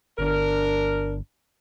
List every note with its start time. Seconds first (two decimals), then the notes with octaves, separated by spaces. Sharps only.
0.19 G1 D4 A#4